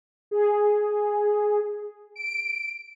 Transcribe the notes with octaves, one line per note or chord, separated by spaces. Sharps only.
G#4
D7